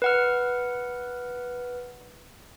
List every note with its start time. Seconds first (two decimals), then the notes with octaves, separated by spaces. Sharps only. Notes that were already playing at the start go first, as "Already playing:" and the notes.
0.02 B4 F#5 F6